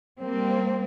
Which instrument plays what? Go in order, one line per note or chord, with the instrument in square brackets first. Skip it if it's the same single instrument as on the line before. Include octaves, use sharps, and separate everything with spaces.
[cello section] G3 A#3 C4